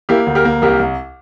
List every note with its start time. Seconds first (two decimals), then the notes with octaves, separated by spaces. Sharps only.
0.09 A#3 E4 G4
0.27 D2
0.35 G4 A#4
0.45 A#3
0.62 C2 G4 A#4
0.79 C2